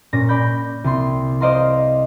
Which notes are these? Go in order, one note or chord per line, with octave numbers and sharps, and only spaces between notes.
A#2 C#4 A#6
D5 B5 G6
C2 C6
C5 D5 D#5 F5 A#5 C6